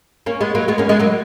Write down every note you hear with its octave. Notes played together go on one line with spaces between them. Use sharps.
A#3 C#4
G#3 B3
F#3 A#3
G#3 B3
A#3 C#4
G#3 B3
F#3 A#3